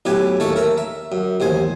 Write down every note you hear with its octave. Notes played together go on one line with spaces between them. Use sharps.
B1 A2 G4 B4 G#5
D#2 A3 C#4 A4 C#6
A#4 E5 A#5
E5
F#2
A1 D#2 C5 G#5